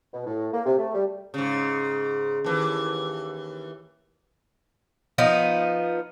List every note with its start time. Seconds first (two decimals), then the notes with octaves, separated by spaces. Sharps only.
0.13 B2
0.27 A2
0.52 A#3
0.65 C3
0.78 A3
0.93 G3
1.34 G#2 C#3
2.44 D#2 E3
5.18 F3 B3 D#4